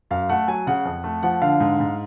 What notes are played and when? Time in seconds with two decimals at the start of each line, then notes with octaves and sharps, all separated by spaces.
0.11 F#2 F5
0.29 A3 F#5
0.48 F#3 G#5
0.67 C#3 F#5
0.85 F2
1.04 A3
1.23 F3 F#5
1.42 D3 F5
1.60 G#2
1.80 G#2